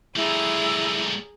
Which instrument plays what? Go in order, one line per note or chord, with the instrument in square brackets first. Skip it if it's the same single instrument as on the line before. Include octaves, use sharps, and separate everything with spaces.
[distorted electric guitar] G3 A3 [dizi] E4 [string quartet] G#4 A#5